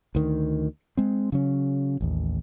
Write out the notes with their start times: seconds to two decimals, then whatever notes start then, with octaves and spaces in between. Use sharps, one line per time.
0.15 D2 D#3
0.97 G#3 C4
1.32 C#3 F#3 C#4
2.01 A1 D#2